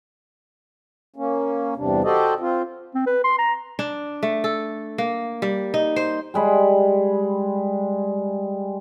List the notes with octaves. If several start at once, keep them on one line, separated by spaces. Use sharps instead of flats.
A#3 C#4
E2 G2 C3 D4
F#4 G4 A4 C5 D5 D#5
C4 F4
C4
B4
C6
A#5
D4
A3
A4
A#3
G3
D#4
C5
G3 G#3 B5